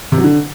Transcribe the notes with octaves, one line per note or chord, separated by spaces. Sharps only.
C3
F#3
D3